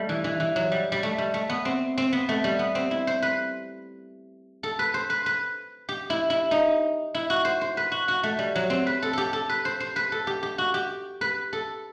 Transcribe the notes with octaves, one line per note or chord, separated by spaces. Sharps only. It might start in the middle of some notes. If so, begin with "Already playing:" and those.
Already playing: G3 A3
E3
E3
E3
F#3
G3
G3
A3
G3
A3
B3
C4
C4
B3
A3
G3
B3
C4
E4
C5
B4
A4
B4
C5
B4
B4
G4
E4
E4
D#4
E4
F#4
C5
C5
B4
F#4
F#4
A3
G3
F#3
C4
B4
A4
G4 A4
A4
B4
C5
C5
B4
A4
G4
G4
F#4
G4
B4
A4